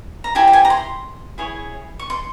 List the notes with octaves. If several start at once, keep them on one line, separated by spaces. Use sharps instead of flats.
A#5
E4 G4 C5 G#5
G5
G#5
A#5
C6
E4 G#4 C#5
C#6
C6